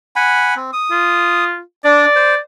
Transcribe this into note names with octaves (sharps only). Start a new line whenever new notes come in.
F#5 G#5 B5
C4
D#6
F4
D4 D5
C5